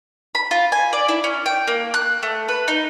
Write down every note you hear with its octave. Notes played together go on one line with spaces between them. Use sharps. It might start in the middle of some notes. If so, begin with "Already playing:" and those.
B5
F4
G#5
D5
E4
C#4
G5
A#3
F#6
A3
B4
D#4